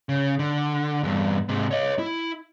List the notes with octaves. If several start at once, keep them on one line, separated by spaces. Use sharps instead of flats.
C#3
D3
E2 G2
G#2 C3
C#5 D#5
E4